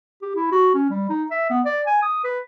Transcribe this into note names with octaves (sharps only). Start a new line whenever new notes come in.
G4
E4
F#4
C#4
G3
D#4
E5
B3
D5
G#5
D#6
B4